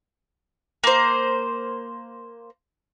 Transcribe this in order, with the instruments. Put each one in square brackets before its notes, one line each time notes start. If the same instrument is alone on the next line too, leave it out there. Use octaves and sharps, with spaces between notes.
[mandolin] A#3 C5